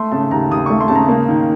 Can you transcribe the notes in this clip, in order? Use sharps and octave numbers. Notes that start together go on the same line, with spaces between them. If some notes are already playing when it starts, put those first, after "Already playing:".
Already playing: A3 C6
C#3 A5
D#2 A#5
D#2 D#6
A3 C#6
C6
C#3 A5
A#5
A#3
D#3